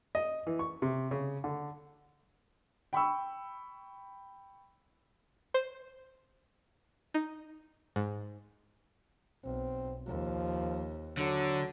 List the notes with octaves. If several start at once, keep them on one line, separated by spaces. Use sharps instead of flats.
D#5
E3
C#6
C3
C#3
D3
G5 B5 C#6 E6
C5
D#4
G#2
B1 C4
D#2 F3
D3 F#3